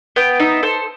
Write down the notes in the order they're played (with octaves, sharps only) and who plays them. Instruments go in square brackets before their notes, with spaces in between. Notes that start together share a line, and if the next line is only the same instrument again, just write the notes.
[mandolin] B3 G5
D#4 E5
A4 C5